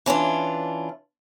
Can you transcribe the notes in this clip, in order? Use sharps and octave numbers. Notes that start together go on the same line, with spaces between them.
E3 C#4 D4 F4